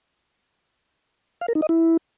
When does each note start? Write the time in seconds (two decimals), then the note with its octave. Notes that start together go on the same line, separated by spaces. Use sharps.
1.41 F5
1.48 A#4
1.55 D#4
1.62 D#5
1.69 E4